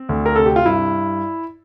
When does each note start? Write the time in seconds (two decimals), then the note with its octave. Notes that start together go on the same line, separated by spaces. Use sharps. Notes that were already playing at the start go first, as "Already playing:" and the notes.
Already playing: C4
0.09 D2
0.26 A#4
0.36 C3 A4
0.46 G4
0.56 F4
0.66 G2 E4